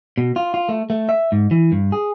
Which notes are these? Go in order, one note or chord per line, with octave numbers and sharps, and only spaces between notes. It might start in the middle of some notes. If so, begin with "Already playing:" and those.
B2
F4
F4
A3
A3
E5
G#2
E3
G2
G#4